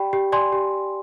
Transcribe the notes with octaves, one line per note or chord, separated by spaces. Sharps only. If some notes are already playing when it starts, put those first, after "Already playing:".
Already playing: G4 D5 G5 B5
G4
D5 G#5 C6
G4